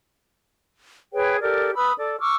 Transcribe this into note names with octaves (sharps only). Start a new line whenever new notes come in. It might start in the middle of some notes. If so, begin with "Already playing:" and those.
G#4 B4 C#5 G5
G4 A4 A#4 D5
B4 B5 D#6 E6
A4 D5
C#6 D6 E6 F6